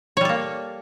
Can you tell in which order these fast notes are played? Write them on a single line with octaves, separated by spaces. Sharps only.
C#5 G3 A4 A#3